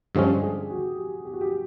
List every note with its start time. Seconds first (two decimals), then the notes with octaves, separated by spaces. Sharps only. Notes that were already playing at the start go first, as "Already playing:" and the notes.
0.15 G2 D3 F3 G#3 C#4 G4
0.43 G#4
0.70 F#4
0.98 G4
1.25 G4
1.34 F#4
1.41 G4